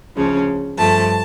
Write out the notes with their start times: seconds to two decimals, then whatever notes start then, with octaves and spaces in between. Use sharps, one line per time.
0.16 D2 C#3 F3 C#4
0.78 G2 F3 A3 A5